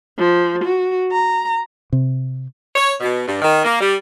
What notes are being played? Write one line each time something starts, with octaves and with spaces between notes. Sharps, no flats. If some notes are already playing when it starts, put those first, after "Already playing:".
F3
F#4
A#5
C3
C#5
B2
G2
D#3
A#3
G3